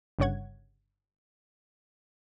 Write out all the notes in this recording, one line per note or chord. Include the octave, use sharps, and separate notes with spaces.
G1 G2 C#3 C#5 F#5 G#6